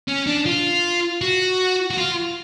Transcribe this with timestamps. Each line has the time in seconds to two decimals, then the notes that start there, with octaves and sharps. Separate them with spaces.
0.08 C#4
0.27 D4
0.46 F4
1.22 F#4
1.90 F#4
1.98 F4